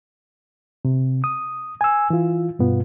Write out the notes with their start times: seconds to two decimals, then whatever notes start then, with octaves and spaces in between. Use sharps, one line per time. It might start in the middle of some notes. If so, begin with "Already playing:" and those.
0.85 C3
1.24 D#6
1.81 G#5 E6
2.10 E3 F4
2.59 G2 B2 B3 F4